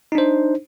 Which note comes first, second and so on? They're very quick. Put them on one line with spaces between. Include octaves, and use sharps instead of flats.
D#4 D4 C5